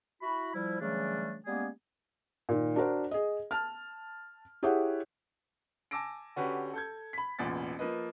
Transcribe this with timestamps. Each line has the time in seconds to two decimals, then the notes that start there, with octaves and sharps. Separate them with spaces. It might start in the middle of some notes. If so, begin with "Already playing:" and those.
0.22 E4 F#4 B5
0.54 F3 G3 E4
0.81 C#3 E3 F#3 G3 A3 D4
1.46 G3 G#3 A#3 B3 C#4 G#4
2.49 A#2 D#3
2.76 D4 F#4 A#4 C5
3.11 G#4 D#5
3.51 A5 F6
4.63 E4 G4 G#4 C#5 E5 F#5
5.91 G#5 A5 D6 E6 A#6 D7
6.36 D3 C#4 F#4 G4 B4
6.73 A4 G6 G#6
7.13 B5 B6
7.39 E1 A1 E2 A#2 A6
7.79 F3 A#3 B4 D#5